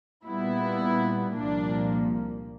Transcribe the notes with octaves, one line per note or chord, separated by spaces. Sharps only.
A#2 G3 B3 E4
C2 A#2 F3 A#3 D4